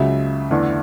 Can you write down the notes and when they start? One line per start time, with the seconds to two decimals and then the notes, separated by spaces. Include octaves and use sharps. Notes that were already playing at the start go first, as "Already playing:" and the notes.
Already playing: C#2 C#3 F#3 E5
0.51 E2 D3 A3 D4